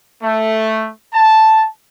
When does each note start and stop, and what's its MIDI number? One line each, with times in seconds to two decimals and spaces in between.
0.22 0.89 57
1.14 1.67 81